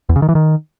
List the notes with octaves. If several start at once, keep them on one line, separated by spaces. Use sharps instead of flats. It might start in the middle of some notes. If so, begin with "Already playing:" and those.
E2
C#3
D#3
E3
D#3